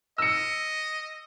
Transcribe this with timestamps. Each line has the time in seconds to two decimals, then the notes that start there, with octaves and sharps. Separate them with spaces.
0.18 D#5 E6 C#7